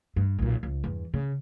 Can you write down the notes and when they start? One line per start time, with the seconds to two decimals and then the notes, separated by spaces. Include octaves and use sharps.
0.16 G2
0.39 B1 A#2
0.63 C#2
0.84 E2 G2
1.14 C#3